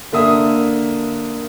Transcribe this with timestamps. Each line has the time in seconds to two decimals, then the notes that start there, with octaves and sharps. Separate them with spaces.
0.12 D3 A#3 E5 D#6